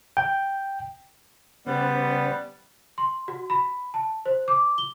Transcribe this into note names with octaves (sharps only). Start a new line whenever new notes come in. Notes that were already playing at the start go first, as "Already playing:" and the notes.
G5
C#3 G3 B3 C5
C6
F#4
B5
A5
C5
D6
G7